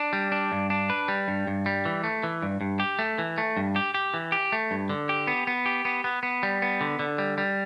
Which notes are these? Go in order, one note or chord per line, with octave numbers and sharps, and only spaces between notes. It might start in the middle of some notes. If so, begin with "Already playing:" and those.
Already playing: D4
G3
D4
G2
D4
B4
G3
G2
G2
G3
E3
A3
E3
G2
G2
G4
A3
E3
A3
G2
G4
G4
E3
G4
A3
G2
D3
G4
B3
B3
G4
B3
B3
B3
G3
B3
D3
D3
G3
G3